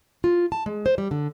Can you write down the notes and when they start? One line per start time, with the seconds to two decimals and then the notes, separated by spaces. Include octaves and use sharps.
0.24 F4
0.52 A5
0.66 G#3
0.86 C5
0.98 G3
1.11 D3